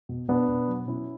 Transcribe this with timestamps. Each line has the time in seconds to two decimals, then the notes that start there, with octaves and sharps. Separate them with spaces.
0.09 B2
0.28 B2 B3 D4
0.48 B2
0.68 F#3
0.87 B2 C#4 E4